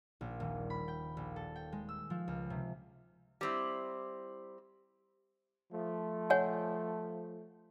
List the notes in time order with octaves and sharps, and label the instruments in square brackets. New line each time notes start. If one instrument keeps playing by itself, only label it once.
[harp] A#1
D#1
B5
G5
A#1
A4
G5
G#3
E6
F3
C#2
C3
[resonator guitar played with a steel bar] G3 C4 E4
[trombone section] F3 A3
[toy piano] C#5 F#5 G#5